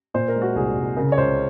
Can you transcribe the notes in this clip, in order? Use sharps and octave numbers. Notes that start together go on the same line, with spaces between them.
A#2 C5
A#4
G#3
F#4
C2 G#4
C2
C#3 A#4
C#5
C#2 C5